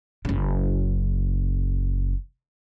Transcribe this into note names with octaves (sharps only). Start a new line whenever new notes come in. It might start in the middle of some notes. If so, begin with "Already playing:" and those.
F#1 C#3